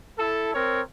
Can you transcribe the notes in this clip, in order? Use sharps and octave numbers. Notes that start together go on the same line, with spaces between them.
E4 A4
C4 A#4 C#5